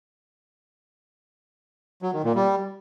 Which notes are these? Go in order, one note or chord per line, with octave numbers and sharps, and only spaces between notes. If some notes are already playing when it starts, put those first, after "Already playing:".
F#3
D#3
A#2
G3